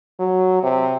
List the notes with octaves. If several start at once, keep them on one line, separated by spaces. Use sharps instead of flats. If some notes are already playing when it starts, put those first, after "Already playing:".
F#3
C3